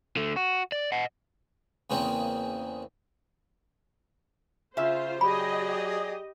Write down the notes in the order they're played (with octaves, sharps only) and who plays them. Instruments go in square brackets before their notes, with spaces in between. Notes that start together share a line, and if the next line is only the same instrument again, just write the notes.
[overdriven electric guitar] D3 A3
F#4
D5
D#5 F#5
[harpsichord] E2 C#3 A#3 C4
[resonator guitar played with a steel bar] C#3 E5 [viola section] F4 C5
[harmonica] F#3 G#4 D5 [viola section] G4 D#5 [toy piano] B5